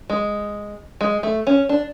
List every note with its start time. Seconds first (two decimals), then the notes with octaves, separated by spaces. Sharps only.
0.10 G#3
1.01 G#3
1.23 A3
1.47 C#4
1.69 D4